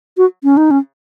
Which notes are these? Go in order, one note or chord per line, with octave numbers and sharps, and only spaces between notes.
F#4
C#4
D#4
C#4